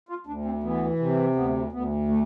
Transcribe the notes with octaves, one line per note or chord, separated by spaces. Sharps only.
F4
D2 D4
C4
E3 B3
C3
D2 B3
D2 B3
A3